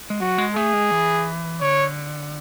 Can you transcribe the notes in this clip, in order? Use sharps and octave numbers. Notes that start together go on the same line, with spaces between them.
G#3
F#3 F#4
G#3
A3 G#4
G#3
E3
D3 C#5